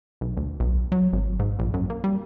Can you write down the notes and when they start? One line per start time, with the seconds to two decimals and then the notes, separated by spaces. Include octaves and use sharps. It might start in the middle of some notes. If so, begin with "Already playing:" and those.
0.21 B1
0.37 D2
0.60 B1
0.92 F#3
1.13 G#1
1.39 G#2
1.59 A#1
1.74 F#2
1.90 A#3
2.04 G3